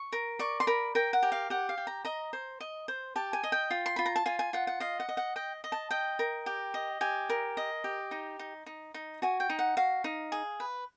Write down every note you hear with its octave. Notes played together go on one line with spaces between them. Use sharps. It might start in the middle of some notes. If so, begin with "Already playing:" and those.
Already playing: C#6
A#4
D5 C#6
C6
A#4 B5
A#4 G5
F#5
G4
F5
G4 F#5
F5
G4
A#5
D#5 A#5
C5
D#5
C5
G4 A5
G#5
D#5
G5
F4
C6
F4 B5
A#5
A5
F4 G#5
G#5
F4 F#5
F#5
D#5 F5
F#5
D#5
F#5
D#5 G5
D#5
A5
D#5 G5
A#4
G4
D#5
G4 G#5
A#4
D#5
G4
D#4
D#4
D#4
D#4
F#4 G#5
G5
D#4
F#5
F#4 F5
D#4
G#4
B4